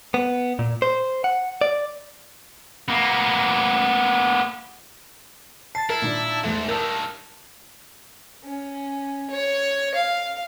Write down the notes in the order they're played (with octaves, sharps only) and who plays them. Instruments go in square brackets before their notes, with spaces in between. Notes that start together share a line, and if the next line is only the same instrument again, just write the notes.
[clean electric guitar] B3
A#2
C5
F#5
D5
[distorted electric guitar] A#3 B3
[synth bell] A5 A6 [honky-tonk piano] C7
[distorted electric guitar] E4 [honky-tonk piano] A#4
[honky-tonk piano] A#2 D#3 D4
[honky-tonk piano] E2 A3 E5 [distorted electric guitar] G#2
[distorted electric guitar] G2 D#3 [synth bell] A#4 [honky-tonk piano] A5 E6 G6
[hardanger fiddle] C#4
C#5
F5